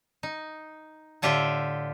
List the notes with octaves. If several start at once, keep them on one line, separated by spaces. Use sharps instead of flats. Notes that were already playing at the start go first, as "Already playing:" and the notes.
D#4
A2 D3 F4 G4 E5 G5